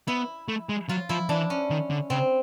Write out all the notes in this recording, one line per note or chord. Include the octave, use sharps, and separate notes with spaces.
B3 E4
A3
G#3
F#3 F4
F3 E4
E3 D4
C#4
D#3
D3
C#3 C4